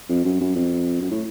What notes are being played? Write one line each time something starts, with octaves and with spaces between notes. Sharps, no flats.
F2
F#2
F#2
F2
F#2
A2